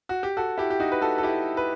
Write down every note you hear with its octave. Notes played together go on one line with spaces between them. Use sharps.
F#4
G4
F#4 A4
E4 G4
G4
D#4 F#4
B4
F#4 A4
A4
E4 G4
B4